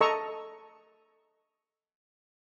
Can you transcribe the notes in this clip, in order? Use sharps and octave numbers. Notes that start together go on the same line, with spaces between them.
A4 D#5 A#5 C#6 E6